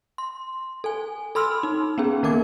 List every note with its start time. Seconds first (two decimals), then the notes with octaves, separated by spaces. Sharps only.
0.18 C6
0.84 A4 G#5
1.35 A4 B5 C6 E6 F6
1.63 D#4
1.98 B3 C#4 G#4
2.23 D#3 A#3 A#4 D6 G#6